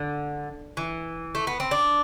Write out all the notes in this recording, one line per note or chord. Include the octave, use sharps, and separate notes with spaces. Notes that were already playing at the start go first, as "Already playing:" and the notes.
Already playing: D3
E3
A3
B3
C4
D4